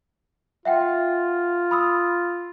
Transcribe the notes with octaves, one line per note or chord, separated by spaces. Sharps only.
F4 E5 F#5 G5
B5 D#6 E6